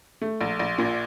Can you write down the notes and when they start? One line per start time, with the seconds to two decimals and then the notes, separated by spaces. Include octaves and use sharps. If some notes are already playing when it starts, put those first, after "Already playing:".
0.22 A3
0.41 A#1
0.59 A#1
0.78 A#2